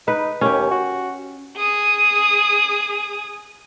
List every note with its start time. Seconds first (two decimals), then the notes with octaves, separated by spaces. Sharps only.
0.08 D#4 B4
0.41 D#2 C#4 G4
0.71 F#4
1.57 G#4 D#6